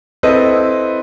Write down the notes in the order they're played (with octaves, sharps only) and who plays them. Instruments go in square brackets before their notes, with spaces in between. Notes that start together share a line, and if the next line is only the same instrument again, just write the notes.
[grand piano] C4 E4 A4 B4 D#5